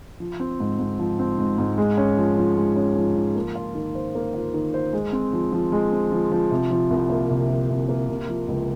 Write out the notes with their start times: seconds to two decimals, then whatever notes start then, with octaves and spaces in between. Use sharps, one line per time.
0.20 F3
0.40 C4
0.60 G#2
0.79 G#2
0.99 F3
1.19 C4
1.39 G#2
1.58 G#2
1.78 G#3
1.97 C#4
2.17 F3
2.37 F3
2.57 G#3
2.76 C#4
2.96 F3
3.16 F3
3.36 A#3
3.55 F4
3.75 D#3
3.95 C5
4.15 A#3
4.34 F4
4.54 D#3
4.74 C5
4.93 G#3
5.12 C4
5.33 F3
5.52 F3
5.72 G#3
5.92 C4
6.12 F3
6.32 F3
6.51 C3
6.71 F3
6.91 C2
7.10 A#3
7.30 C3
7.50 F3
7.70 C2
7.89 A#3
8.09 C3
8.29 F3
8.48 C#2